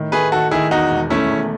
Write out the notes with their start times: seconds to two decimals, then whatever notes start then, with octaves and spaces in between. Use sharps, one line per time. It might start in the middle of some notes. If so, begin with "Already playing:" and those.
Already playing: A2 D#3
0.12 A3 G#4 B4
0.32 D#3 F#4 A4
0.51 D#3 E4 G#4
0.71 E2 D#4 F#4
0.91 E1
1.10 A3 C#4 E4
1.31 E2